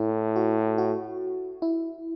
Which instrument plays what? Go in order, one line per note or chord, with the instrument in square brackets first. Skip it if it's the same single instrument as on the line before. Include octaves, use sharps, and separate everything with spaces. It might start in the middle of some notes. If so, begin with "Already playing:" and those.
Already playing: [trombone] A2 [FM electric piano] E4
[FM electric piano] F#4
F#4
E4